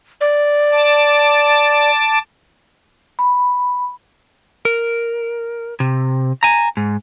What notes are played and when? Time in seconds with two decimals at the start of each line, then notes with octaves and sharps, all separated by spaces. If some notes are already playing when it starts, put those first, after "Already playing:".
0.21 D5
0.72 A5 D6
3.19 B5
4.65 A#4
5.80 C3
6.43 G#5 A#5
6.77 G#2